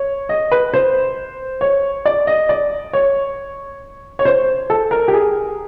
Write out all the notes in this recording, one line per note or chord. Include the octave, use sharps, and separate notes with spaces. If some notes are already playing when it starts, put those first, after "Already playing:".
Already playing: C#5
D#5
B4
C5
C#5
D5
D#5
D5
C#5
C#5
C5
A4
A#4
G4
G#4